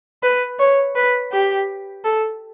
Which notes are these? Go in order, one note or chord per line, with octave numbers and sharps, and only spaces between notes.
B4
C#5
B4
G4
A4